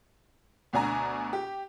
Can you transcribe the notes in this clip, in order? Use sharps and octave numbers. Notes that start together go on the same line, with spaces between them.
D2 B2 D4 G#5 A#5
G4